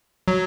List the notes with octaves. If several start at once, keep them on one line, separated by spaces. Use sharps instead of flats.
F#3